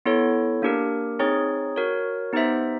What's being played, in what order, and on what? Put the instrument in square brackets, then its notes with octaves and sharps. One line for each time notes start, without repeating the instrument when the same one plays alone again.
[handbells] B3 E4 A4 C#5
A#3 D4 G4 A#4
C4 D#4 G#4 C#5
F#4 A#4 C#5
B3 D#4 G4 C5 E5